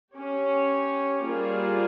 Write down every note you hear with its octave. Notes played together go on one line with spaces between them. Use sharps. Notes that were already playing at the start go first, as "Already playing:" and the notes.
C#4 G4 C#5
G3 A#3 F4 G#4 C5